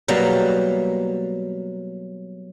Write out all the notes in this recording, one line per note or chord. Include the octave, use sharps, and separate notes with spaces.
B2 F#3 G3 A#3